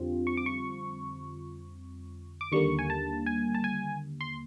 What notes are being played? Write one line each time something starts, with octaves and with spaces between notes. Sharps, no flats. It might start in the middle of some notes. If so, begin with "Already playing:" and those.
Already playing: F2 D3 G3 C4 F4
C#6
D6
C#6
D6
D#2 D3 G3 A#3 C#6
G#5
A5
G#5
A5
G#5
C6